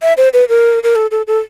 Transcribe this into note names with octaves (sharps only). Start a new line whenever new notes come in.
E5
C5
B4
A#4
A#4
A4
A4
A4